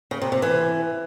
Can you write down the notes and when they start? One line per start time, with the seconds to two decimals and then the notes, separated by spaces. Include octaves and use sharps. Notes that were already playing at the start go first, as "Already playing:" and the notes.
0.11 C#3
0.22 C3
0.32 C3
0.42 E3